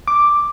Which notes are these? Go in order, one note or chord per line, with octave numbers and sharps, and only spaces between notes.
D6